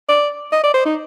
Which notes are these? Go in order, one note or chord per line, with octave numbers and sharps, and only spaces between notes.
D5
D#5
D5
C5
D#4